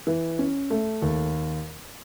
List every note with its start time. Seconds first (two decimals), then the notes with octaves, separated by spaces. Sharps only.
0.07 E3
0.39 C#4
0.70 A3
1.02 D#2